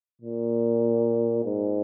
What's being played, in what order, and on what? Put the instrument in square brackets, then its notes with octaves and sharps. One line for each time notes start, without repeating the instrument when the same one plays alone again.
[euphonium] A#2
G#2